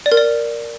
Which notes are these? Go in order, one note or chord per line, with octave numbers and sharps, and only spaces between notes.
D5
A#4
D5